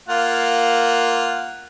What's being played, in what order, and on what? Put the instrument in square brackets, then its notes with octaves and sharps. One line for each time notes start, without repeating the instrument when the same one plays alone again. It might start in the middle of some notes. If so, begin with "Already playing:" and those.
[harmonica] A#3 F4 F#5